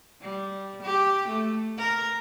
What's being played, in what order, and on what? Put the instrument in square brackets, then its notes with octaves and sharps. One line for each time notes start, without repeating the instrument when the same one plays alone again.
[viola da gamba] G3
G4
A3
A#4